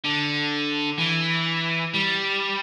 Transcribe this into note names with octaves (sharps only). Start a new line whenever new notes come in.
D3
E3
G3